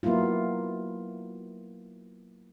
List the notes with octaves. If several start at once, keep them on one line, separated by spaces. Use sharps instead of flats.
F#3 A#3 B3 E4 F4